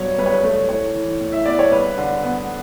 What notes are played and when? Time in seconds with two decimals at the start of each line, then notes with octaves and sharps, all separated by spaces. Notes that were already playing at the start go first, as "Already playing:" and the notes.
Already playing: G2 F#3 B3 C#5
0.18 G2 B4
0.26 C#5
0.34 B4
0.43 A3
0.69 A2 C#5
0.95 E3
1.20 A2
1.32 E5
1.46 B3 D5
1.59 C#5
1.71 G2 B4
1.98 D3
2.23 B3